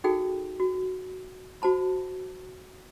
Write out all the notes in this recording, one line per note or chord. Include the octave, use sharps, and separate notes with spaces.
D#4 F#4 G#4 A4 G5
F#4
F#4 C5 A5 B5